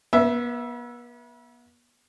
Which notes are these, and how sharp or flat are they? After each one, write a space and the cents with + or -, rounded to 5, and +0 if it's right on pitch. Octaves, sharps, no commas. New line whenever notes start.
B3 -40 B4 +30 E5 +5